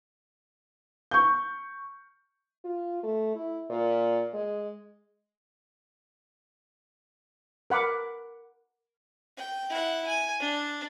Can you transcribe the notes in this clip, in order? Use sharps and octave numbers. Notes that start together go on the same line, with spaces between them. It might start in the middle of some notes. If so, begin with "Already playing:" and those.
C#6 G6
F4
A3
E4
A#2
G#3
A#4 F#5 B5 D6
G5
E4 F#5
G#5
D4